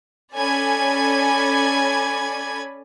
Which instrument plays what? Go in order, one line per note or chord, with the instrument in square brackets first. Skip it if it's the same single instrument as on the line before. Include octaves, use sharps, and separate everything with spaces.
[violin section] C#4 A4 D5 G#5 B5 G#6